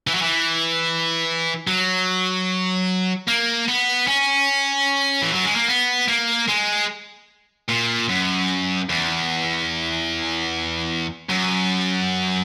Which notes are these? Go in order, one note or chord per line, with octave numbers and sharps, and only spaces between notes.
E3
F#3
E3
F#3
A#3
B3
C#4
E3
F#3
G#3
A#3
B3
A#3
G#3
A#2
F#2
E2
F#2